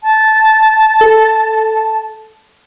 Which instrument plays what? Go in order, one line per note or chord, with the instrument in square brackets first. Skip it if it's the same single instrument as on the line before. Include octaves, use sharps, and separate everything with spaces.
[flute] A5
[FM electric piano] A4